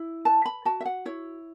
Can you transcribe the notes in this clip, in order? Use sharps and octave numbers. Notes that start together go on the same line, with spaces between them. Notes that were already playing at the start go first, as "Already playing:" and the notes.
Already playing: E4
B4 A5
B5
F#4 A5
E5
F#5
E4 C#5